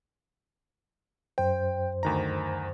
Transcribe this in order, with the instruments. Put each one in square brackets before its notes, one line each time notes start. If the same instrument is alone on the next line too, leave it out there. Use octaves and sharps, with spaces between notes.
[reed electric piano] F#2 C5 [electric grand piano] G5
[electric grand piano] D2 D#3 A#5